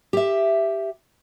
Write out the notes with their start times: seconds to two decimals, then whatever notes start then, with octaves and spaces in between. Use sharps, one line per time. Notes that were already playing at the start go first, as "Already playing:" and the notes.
0.13 G4 E5